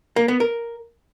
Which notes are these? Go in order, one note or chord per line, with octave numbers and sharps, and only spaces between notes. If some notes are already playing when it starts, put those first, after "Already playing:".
A#3
B3
A#4